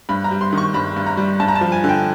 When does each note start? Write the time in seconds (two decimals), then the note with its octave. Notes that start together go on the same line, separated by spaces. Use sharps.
0.09 G2 B5
0.24 A#5
0.31 G3
0.41 C6
0.53 D#3 C#6
0.74 G2 B5
0.96 G2
1.06 A#5
1.17 G3
1.40 G2 A5
1.48 A#5
1.56 A5
1.61 F3
1.72 G#5
1.84 D3
1.89 G5